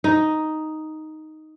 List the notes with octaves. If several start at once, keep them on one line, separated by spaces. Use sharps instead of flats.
D#4